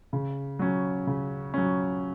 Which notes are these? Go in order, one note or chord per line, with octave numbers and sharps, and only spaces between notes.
C#3
F#3 C#4
C#3
F#3 C#4